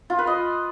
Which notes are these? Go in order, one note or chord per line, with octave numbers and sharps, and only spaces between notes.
F4
B4
D#5